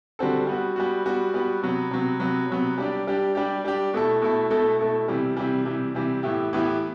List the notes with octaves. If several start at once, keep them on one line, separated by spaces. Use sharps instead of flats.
D3 G3 C4 F#4 A4
G3 B3 F#4
G3 B3 F#4
G3 B3 F#4
G3 B3 F#4
C3 F#3 B3
C3 F#3 B3
C3 F#3 B3
C3 F#3 B3
G3 D4 G4
G3 D4 G4
G3 D4 G4
G3 D4 G4
B2 A3 E4 A4
B2 A3 E4 A4
B2 A3 E4 A4
B2 A3 E4 A4
C3 E3 G3
C3 E3 G3
C3 E3 G3
C3 E3 G3
A2 E3 B3 E4 G4
A2 E3 B3 E4 G4